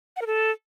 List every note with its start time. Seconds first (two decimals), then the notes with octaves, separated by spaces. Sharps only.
0.16 F#5
0.21 A#4
0.27 A4